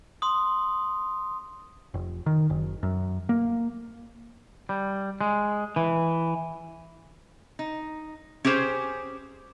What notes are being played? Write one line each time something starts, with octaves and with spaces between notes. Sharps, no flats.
C6 D#6
F1
D#3
F#1
F#2
A#3
G3
G#3
E3
D#4
C#4 G4 G#4 C5